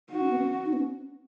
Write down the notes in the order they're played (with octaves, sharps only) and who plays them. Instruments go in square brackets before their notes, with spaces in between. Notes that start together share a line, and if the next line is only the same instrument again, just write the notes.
[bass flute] D#4 [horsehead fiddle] F#4
[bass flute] C#4
B3
C#4
D#4
B3
C#4